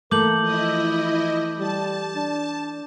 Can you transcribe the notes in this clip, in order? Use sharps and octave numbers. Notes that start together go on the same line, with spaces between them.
E3 A3 A#3 A#4 D6 G6 F#7
F3 E4 D#5
G3 A5
D4